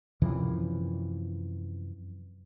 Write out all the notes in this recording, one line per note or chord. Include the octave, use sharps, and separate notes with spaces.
F#2 C3 E3 F3